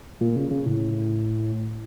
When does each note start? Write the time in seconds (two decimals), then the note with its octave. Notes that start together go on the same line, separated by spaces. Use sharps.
0.21 A#2
0.36 C#3
0.51 C#3
0.66 A2